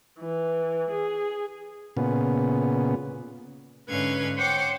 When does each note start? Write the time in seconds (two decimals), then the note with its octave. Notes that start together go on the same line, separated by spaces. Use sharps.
0.19 E3
0.91 G#4
1.97 A#2 C#3 B3
3.88 G#2 D3 C#4 B4 F5 G#6
4.36 C5 C#5 F#5 G5 C6 D6